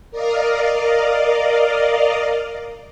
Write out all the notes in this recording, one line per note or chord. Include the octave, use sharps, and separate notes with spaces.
A#4 D5 D#5 F5